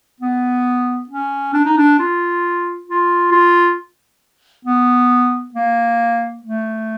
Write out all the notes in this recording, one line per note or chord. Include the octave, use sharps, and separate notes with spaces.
B3
C#4
D4
D#4
D4
F4
F4
F4
B3
A#3
A3